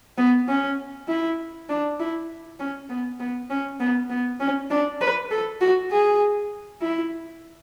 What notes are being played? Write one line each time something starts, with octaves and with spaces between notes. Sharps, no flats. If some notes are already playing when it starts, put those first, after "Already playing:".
B3
C#4
E4
D4
E4
C#4
B3
B3
C#4
B3
B3
C#4
D4
B4
A4
F#4
G#4
E4